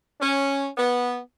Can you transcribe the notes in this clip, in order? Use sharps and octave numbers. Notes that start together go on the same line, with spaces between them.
C#4
B3